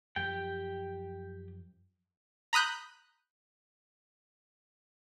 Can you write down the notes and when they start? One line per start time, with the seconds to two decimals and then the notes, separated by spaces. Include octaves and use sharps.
0.16 F#2 F3 G4 G5
2.53 A#5 B5 D#6 F#6 G6